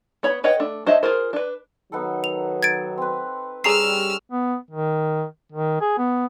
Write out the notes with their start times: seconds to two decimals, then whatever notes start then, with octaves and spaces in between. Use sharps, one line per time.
0.23 B3 C#5 B5
0.44 B4 C#5 D#5 F#5 G5
0.60 A3 D4
0.87 D4 C5 C#5 D#5 E5
1.03 F4 G#4 A#4 C5
1.33 D4 B4
1.92 D#3 F#3 B3 D#4 A4
2.24 F7
2.63 G#6 A6 D7
2.97 C4 B4
3.64 G3 C#4 G#4 A4 A#5 E6 F6 C7
4.31 B3
4.71 D#3
5.52 D#3
5.81 G#4
5.98 B3